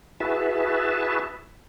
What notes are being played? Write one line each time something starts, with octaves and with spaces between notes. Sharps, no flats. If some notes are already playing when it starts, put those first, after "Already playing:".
E4 F#4 G#4 B4 E5 A5